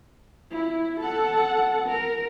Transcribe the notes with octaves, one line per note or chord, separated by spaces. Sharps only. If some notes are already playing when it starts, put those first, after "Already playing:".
E4
A4 F#5
A#4